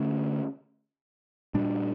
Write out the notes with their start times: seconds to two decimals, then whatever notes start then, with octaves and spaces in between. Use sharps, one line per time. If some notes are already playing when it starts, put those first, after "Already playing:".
Already playing: D3 A3 C#4
1.54 A#2 G3 D4